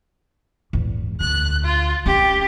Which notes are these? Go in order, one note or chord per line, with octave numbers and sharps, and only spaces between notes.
E2 G#2
D2 F#6
F4
C#4 G4